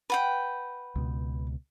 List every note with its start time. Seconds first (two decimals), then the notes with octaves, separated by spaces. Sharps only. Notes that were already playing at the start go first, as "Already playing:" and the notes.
0.10 B4 F#5 G5
0.95 C#2 B2